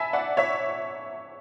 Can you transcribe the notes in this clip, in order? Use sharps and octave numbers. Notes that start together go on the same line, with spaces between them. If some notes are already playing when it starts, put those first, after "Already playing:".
Already playing: E5 G#5 A5 B5
D5 F#5
C#5 E5